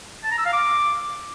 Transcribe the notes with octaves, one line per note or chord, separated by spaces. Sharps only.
A5
A#5
E6
F5
D6